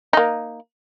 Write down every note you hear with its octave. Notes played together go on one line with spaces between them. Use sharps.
A#3 D#4